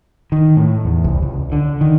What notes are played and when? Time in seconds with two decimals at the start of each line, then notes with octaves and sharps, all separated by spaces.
0.32 D#3
0.57 A2
0.85 E2
1.04 C2
1.22 C#2
1.52 D3
1.81 D#3